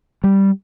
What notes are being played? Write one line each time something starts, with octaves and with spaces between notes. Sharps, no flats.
G3